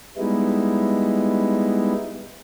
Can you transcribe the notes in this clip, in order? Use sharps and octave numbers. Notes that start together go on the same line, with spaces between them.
G3 G#3 B3 D#4 E4